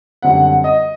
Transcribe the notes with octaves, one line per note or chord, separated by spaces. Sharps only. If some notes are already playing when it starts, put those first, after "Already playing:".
F#2 D3 G3 C4 F#5
D#5